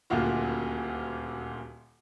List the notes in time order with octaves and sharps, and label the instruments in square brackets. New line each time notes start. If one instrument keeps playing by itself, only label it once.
[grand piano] D#1 D2 A#2 F4 F#4